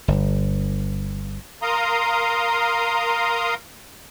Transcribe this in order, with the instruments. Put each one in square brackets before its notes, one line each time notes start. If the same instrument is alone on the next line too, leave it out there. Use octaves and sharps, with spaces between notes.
[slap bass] G1
[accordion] A#4 F5 A#5 C6 D#6